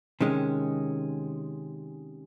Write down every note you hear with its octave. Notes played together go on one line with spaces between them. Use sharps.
C3 D#3 G#3 C#4